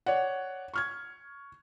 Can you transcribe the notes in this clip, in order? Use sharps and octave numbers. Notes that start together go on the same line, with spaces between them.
C#5 D5 F#5
C#6 F6 G#6